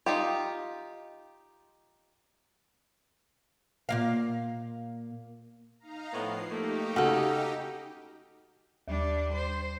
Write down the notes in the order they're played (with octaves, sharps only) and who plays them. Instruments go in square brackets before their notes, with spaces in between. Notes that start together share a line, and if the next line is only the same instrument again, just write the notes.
[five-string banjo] D#4 F4 G4
[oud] A#2 A#3 F5
[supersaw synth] D#4 F5 A#5
[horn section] A2 B3 [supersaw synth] F3 C7
[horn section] A3 A#3 [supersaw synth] D#4 G4
[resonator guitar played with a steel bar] C#3 A4 [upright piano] F#4
[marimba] D#2 [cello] G3 D4
[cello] C5